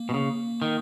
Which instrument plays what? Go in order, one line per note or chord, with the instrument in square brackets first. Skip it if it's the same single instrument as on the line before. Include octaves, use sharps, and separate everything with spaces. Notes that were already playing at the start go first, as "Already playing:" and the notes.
Already playing: [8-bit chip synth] A#3
[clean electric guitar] B2
C#3
D#3